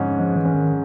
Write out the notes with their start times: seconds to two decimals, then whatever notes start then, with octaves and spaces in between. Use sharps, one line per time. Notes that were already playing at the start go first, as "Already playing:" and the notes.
Already playing: F2 G#2 D3 C#4
0.18 F3 G#3
0.36 E3
0.45 C#4
0.54 D#3